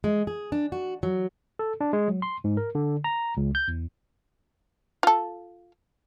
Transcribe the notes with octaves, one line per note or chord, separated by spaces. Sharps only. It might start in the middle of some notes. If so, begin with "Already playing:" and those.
G#3
G#4
D4
F#4
F#3
A4
D4
G#3
F#3
C6
G#2
A#4
D3
A#5
C#2
G6
E2
F4 A4